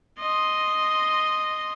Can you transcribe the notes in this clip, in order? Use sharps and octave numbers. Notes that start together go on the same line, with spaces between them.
D#5 C6